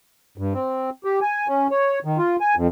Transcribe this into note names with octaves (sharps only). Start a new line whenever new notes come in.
G2
C4
G4
G#5
C#4
C#5
D#3
F4
G#5
F2